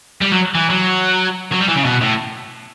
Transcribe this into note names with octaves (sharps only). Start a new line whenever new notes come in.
G3
F#3
E3
F#3
F#3
G3
E3
C#3
B2
A2